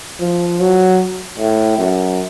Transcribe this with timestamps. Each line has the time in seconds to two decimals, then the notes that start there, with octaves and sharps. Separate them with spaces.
0.20 F3
0.60 F#3
1.39 A2
1.78 F#2